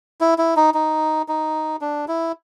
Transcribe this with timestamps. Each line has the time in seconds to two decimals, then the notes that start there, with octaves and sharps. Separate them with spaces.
0.21 E4
0.38 E4
0.56 D#4
0.74 D#4
1.28 D#4
1.81 D4
2.08 E4